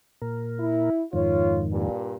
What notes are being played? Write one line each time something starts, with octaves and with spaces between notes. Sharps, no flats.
A#2 A#4
E4
F2 G#2 D#3 F4 C#5
G2 A#2